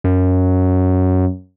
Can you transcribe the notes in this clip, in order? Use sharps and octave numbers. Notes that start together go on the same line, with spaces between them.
F#2